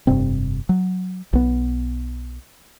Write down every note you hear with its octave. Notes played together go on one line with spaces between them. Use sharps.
F1 G2 C3 C4
F#3
B1 B3